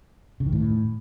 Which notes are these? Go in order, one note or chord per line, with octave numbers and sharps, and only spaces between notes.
C#3
D#3
A2